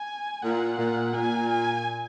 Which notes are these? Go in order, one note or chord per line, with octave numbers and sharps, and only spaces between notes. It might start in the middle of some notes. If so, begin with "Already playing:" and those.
Already playing: G#5
A#2 F#5
A#2
A#2 G#5
G#5